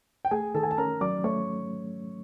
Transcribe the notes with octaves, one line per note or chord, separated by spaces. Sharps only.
G5
A3 G#4 G#5
D#3 A4 A5
G#5
A5
C#4 A#4 A#5
F#3 D5 D6
A3 C#5 C#6